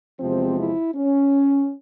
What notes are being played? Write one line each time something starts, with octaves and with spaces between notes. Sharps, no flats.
E2 C3 F3 G#3 C4
E4
C#4